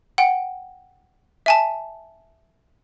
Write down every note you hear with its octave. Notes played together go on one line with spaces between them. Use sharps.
F#5 G5
E5 G#5 A5